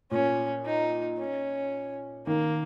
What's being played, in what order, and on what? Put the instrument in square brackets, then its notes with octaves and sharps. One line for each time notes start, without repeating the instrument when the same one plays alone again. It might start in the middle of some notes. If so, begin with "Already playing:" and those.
[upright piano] A#2 [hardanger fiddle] C#4
[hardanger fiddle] D#4
C#4
[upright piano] D#3 [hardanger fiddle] A#3